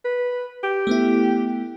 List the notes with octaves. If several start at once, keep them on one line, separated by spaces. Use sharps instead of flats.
B4
G4
A3 B3 E4